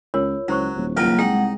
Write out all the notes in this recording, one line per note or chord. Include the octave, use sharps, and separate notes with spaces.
C#2 F4 A#4 C#5
C#2 F#3 E4 C5 C#6
D#1
C#2 F#3 A#3 A#4 G5
C2 G#3 D#4 G#4 F#5 G5